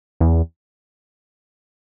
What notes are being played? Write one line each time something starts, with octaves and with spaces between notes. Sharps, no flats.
E2